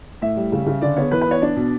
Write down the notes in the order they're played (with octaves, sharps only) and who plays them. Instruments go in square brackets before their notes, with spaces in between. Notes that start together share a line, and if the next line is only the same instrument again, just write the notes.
[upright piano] A2 E5
G3
C#3
C#3
D3 D5
B3 C#5
E3 B4
B3 B4
C#5
D4 D5
B2